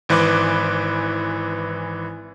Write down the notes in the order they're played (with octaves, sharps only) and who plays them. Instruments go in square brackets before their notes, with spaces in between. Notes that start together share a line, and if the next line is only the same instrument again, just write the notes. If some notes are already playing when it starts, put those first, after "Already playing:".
[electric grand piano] G#1 E3 B4 C5 D6 F#6